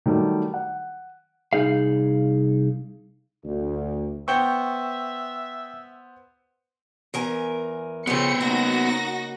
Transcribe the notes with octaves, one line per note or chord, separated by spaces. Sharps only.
D#3 F#3 G3 A3
F#5
C2 D#4 G#4 F5
D2
B3 C5 E5 G5 C#6 G7
E2 A#4 G#5
C#3 F3 B3 C5 C#7
C#3 A#3 D#4 F#4 A#6